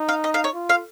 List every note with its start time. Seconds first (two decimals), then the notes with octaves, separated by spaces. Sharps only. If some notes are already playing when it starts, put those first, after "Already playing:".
Already playing: D#4
0.09 F5
0.24 D#5
0.34 F5
0.44 C#5
0.54 F4
0.69 F5